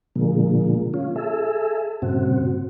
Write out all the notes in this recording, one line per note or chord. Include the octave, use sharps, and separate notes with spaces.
A#2 D3 F3 G#3 A#3
C#4 F4
G#4 A4 E5
G2 A#2 C#3 C4 F#4